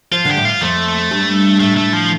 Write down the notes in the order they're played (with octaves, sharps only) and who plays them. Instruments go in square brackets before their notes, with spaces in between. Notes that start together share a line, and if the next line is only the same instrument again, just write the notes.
[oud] F3 [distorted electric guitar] F4
[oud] D3 [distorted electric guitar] G4
[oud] A2
[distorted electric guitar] F4
[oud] F2 [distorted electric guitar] A3
[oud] G2
[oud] A2 [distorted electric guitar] A3
[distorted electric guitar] A3
F3